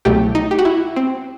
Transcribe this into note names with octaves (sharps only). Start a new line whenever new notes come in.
C2 B2 F#3 A3 G4
D#4
G4
F#4
E4
C4